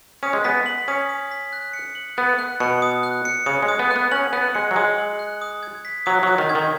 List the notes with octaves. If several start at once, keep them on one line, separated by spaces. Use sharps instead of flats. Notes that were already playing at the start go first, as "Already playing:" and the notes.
C#4 D#6
G#3
B3 B6
F#7
C#4 D#6
D#6
B6
F#6
C#7
F#7
B3 F#6
F#6
B2 C#7
D#6
F#6
C#7
C#3 D#6
G#3
D#6
B3
F#6
B3
C#4 F#7
B3 F#6
G#3 C#7
F#3
G#3 D#6
F#7
F#6
D#6
G#6
B6
F#3 D#6
F#3 D#6
D#3
G#6
D#3